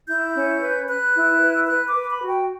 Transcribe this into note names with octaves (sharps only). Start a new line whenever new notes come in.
E4 G6
C#4
B4
B4 F#6
E4
B4
B4 F#6
D6
B4
B5
F#4
G5